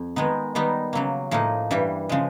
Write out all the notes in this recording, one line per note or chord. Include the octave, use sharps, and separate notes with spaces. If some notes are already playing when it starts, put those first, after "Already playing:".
Already playing: F2
D#3 G#3 B3 D#4
D#3 G3 B3 D#4
C#3 F#3 A#3
A2 F3 A#3 D#4
G2 E3 G3
C#3 F3 G#3